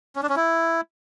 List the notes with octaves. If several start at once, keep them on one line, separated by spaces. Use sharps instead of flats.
C#4
D4
C#4
E4